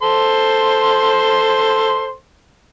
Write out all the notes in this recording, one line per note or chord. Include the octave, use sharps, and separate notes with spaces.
A4 C5 C6